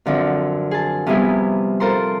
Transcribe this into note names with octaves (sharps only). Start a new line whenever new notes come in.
F#2 D3 F3 C4
G#4 A5
C3 F3 G3 B3 E4 G#4
F4 A4 A#4 C5 C6